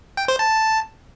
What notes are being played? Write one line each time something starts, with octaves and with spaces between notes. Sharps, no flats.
G5
C5
A5